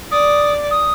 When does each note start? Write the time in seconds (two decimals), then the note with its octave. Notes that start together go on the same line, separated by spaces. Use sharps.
0.11 D5 D#6
0.71 D#6